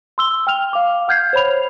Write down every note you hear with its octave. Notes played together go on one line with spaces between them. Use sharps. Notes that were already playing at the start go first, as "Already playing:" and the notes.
C6 E6 G7
G5 F6 F7
F5 D6
F#5 F6 G6 G#6 C7
C5 C#5 B5 F7